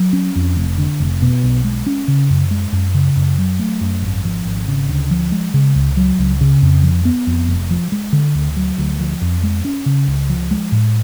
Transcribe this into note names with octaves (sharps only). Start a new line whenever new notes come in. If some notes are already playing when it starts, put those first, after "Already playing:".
Already playing: F#3
C#4
F2
F1
D3
F1
B2
B1
G#3
C#4
C#3
F#2
G#3
F#2
C#3
F#2
F#3
A3
F#2
G#1
F3
G#1
C#3
D2
F3
G#3
C#3
C#2
F#3
C#2
C#3
F2
F3
B3
F2
F1
F3
G#3
D3
D2
F#3
D2
F3
F2
G#3
C#4
C#3
C#2
F3
G#3
A2